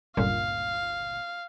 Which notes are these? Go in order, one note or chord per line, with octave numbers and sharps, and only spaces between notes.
G1 C#2 A#2 F5